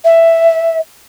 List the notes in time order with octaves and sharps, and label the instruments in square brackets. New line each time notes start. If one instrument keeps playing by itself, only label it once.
[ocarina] E5